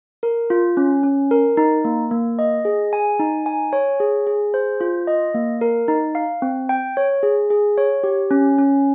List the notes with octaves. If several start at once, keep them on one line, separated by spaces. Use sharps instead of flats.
A#4
F4
C#4
C#4
A#4
D#4
A#3
A#3
D#5
G#4
G#5
D#4
G#5
C#5
G#4
G#4
C5
F4
D#5
A#3
A#4
D#4
F5
C4
G5
C#5
G#4
G#4
C#5
G4
C#4
C#4